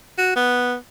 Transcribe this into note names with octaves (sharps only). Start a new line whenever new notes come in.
F#4
B3